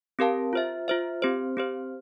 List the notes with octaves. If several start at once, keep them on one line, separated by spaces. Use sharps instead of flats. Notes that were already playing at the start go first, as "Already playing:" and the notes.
C4 G4 A#4 F5 A5
F4 C5 E5
F4 C5 E5
C4 G4 C5
C4 G4 C5